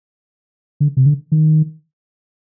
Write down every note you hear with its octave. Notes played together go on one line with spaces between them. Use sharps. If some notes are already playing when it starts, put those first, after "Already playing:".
D3
C3
D3
D#3